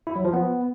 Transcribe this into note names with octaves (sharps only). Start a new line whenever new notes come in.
E4
F#3
F3
B3